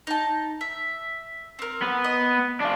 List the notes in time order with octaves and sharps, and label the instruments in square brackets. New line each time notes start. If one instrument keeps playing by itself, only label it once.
[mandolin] D#4 A5
E5
C4 A#4
[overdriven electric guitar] B3
[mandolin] D#5
[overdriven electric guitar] D4 F4